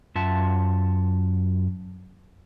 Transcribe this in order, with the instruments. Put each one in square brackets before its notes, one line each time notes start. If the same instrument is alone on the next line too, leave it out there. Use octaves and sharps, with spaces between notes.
[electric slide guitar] F#2 F4 E5 F#5 A5